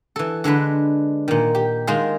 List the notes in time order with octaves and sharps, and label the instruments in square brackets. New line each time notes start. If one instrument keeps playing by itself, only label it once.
[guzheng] E3 A4
D3 G#3 D4 B4
A#2 D#3
G4
D#3 G#3 F4 G#4